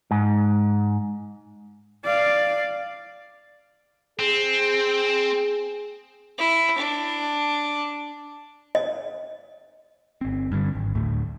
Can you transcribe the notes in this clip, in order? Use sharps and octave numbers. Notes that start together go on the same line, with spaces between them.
G#2
D5 F5
C4 G#4
E4
D4
D#5
G1 C4
G2 D3
G#1
D2 A2